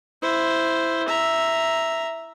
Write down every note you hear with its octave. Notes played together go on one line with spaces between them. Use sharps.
E4 C5
E5 A#5